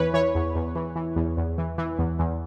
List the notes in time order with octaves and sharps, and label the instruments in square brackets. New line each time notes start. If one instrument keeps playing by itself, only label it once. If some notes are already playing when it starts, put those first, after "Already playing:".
Already playing: [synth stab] E2 E3 B4 C#5
E3 C#5
E2
E2
E3
E3
E2
E2
E3
E3
E2
E2